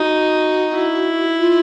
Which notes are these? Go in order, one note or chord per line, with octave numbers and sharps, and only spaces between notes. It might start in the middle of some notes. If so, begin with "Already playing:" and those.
Already playing: D#4 F#4
E4
F4